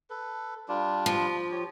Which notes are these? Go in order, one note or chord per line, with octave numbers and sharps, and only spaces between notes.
A4 B4
G3 D4 F4
F3
G4 C#5